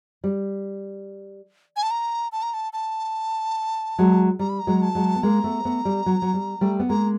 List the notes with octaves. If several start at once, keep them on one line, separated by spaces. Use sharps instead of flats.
G3
G#5
A5
A#5
A5
A#5
A5
A5
F#3 G#3
G3 A#5
B5
A#5
F#3 G#3
A5
F#3 G#3
B3
G#3 A#3 A#5
A3 B3
A3 B3
G3
F#3
F#3
G3
G3 A3
B3
G#3 A#3 A#5